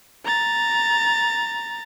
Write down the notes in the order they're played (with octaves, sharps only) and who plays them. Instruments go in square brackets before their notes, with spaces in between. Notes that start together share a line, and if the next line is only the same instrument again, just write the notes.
[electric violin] A#5 A6